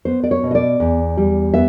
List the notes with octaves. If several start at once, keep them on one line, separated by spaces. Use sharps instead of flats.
B3 C5
D5
C#5
B2
D#5
D5
E2
G3
B3 E5